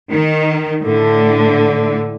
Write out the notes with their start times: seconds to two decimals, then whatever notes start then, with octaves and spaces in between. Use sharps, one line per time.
0.11 D#3
0.83 A2 D3